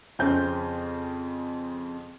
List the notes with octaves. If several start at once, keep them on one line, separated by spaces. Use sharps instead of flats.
F2 C#3 C4 C#4 G6